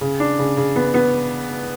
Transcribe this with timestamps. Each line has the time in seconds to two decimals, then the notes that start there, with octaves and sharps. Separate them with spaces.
0.01 C#3
0.20 D4
0.39 C#3
0.57 C#3
0.76 B3
0.94 B3